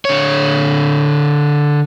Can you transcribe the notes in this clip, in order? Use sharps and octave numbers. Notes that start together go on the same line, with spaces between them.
D3 C#5